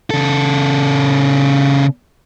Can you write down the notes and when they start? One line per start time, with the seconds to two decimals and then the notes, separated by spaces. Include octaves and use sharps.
0.10 C#3 A4